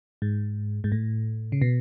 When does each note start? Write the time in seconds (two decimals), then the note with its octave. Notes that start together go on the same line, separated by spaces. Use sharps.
0.22 G#2
0.84 G#2
0.92 A2
1.52 C#3
1.62 B2